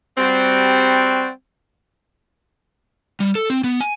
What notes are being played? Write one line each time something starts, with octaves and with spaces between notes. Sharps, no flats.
G3 C4 F#4
G3
A4
C4
B3
G#5